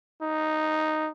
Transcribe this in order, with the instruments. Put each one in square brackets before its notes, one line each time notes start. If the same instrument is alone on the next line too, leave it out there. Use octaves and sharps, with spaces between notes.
[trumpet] D#4